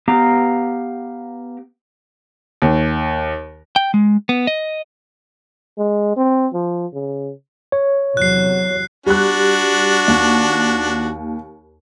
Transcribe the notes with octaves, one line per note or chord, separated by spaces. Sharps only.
B3 G4 F5 A#5
D#2
G5
G#3
B3
D#5
G#3
C4
F3
C#3
C#5
E2 C3 F#3 F#6 C7
G3 D4 F#4 F#6
D#2